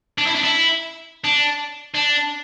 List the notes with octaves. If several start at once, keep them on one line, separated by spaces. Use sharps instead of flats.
D4
E4
D4
E4
D4
D4